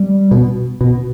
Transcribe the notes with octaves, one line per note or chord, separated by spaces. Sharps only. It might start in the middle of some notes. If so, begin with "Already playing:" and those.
Already playing: G3
B2
B2